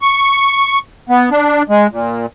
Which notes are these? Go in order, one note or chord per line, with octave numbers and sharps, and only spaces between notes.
C#6
B3
D4
G#3
A#2